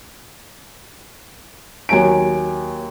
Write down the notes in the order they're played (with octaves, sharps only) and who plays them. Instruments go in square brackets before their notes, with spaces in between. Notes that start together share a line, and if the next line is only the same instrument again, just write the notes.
[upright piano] D#2 F#3 G#5 D7